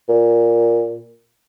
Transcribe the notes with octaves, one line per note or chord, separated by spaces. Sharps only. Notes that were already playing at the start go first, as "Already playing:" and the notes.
A#2